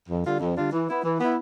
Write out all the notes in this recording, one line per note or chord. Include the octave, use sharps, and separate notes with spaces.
F2
D3 G3 D4 F4
F2
D3 G3 D4 F4
E3
B3 E4
E3
B3 E4